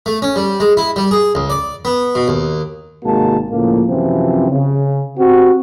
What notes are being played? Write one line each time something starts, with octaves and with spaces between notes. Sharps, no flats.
A3
C#4
G3
G#3
E4
G3
G#4
C#2
D5
B3
B2
D#2
G#1 C3 G#3 A#3 F#4 A5
C#2 A2 F3 A#3
F#2 C3 E3 F3 C4
C#3
C4 F#4 G4